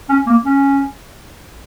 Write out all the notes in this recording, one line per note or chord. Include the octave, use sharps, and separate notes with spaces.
C#4
A#3
C#4